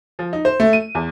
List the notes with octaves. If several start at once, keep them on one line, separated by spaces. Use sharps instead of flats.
F3
D#4
C5
A3
D#7
E2